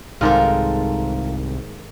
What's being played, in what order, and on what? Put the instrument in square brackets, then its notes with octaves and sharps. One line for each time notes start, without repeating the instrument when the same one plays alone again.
[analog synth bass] C2 [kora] G#2 D#3 G#3 [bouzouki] F4 A4 A#4